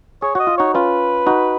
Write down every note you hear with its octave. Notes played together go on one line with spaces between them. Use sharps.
G#4 C#5
F#4 C#5 D#5
F4
D#4 F#4 C#5
C#4 F4 B4
D#4 F#4